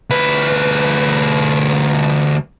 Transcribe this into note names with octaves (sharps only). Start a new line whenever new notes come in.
D2 B4